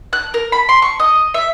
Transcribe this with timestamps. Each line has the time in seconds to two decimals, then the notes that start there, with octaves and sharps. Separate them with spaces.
0.13 F#6
0.34 A#4
0.52 B5
0.69 C6
0.82 C#6
1.00 D#5
1.34 E5